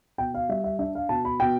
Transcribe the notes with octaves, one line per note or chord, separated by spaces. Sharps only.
B2 G5
F5
G3 E5
E5
D4 E5
F5
B2 A5
B5
B2 G5